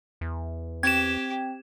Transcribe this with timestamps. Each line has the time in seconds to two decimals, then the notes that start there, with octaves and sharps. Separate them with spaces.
0.21 E2
0.83 C4 G4 G#6 E7